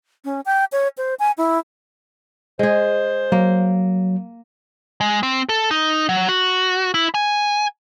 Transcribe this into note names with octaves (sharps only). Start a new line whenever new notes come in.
C#4
G5
C#5
C5
G#5
E4
G#3 G#4 C5
F#3 A#3
G#3
C4
A4
D#4
F#3
F#4
E4
G#5